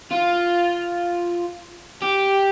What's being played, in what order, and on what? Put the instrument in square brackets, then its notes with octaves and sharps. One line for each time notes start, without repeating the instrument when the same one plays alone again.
[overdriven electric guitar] F4
G4